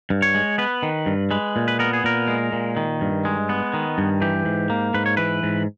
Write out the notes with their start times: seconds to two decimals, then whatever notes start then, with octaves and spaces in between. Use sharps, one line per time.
0.10 G2
0.22 C#5
0.34 G#3
0.58 B3 B4
0.83 D#3
1.06 G2
1.31 G#3 B4
1.56 A#2
1.68 B4
1.79 B3 A#4
1.93 G#4
2.04 A#2 A#4
2.28 G#3
2.52 A#2
2.77 D#3
3.01 G2
3.25 G#3
3.49 B3
3.74 D#3
3.98 G2
4.22 E3 G4
4.45 G#2
4.70 A#3
4.94 G#2 B4
5.06 C#5
5.17 E3 B4
5.43 G#2